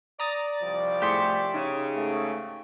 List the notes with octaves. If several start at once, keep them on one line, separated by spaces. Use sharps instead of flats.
D5 A#5 D#6 A6
C2 F3 G3
A2 G4 G#4 E5 C6 C#7
C#3 D#4
G#2 A3